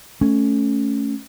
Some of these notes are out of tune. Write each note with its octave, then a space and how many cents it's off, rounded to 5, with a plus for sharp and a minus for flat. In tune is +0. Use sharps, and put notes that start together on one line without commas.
A3 -5 C#4 +0